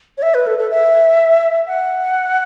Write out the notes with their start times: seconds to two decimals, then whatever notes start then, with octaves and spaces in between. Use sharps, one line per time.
0.18 C#5
0.22 E5
0.34 B4
0.47 A4
0.58 A4
0.70 E5
1.67 F#5